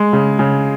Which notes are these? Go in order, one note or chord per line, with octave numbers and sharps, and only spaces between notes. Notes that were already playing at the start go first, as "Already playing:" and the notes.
Already playing: G#3
C#3
C#3